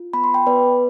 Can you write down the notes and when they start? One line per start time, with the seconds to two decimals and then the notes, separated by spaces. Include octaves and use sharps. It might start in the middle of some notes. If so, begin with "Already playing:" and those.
Already playing: F4
0.13 B3 B5
0.24 C6
0.34 G5 B5
0.47 B3 B4 D5